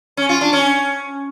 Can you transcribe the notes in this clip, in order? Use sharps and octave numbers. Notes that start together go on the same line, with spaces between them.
C#4
F4
D4
C#4